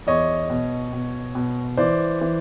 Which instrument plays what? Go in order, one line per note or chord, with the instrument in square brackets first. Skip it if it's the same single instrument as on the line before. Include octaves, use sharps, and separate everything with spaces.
[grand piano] E2 C#5 D#5
B2
B2
B2
E3 C5 D5
E3